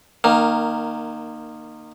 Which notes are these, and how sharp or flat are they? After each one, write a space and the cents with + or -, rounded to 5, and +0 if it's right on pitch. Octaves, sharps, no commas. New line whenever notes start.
D#3 -20 A#3 +0